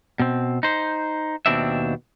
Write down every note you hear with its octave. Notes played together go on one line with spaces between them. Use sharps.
B2 C4
D#4 C5
D#2 B2 C4 D4 E5